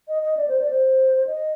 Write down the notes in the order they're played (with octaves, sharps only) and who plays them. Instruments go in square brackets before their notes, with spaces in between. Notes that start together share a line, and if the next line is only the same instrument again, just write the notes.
[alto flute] D#5
D#5
D5
C5
D5
C5
D#5